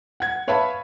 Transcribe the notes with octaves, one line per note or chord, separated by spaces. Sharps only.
F#5 G#6
B4 C#5 E5 F5 A5 B5